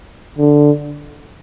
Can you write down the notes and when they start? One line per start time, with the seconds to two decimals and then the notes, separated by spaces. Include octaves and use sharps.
0.38 D3